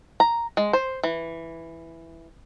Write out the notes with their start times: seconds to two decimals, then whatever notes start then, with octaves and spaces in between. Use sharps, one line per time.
0.20 A#5
0.57 G#3
0.73 C5
1.03 E3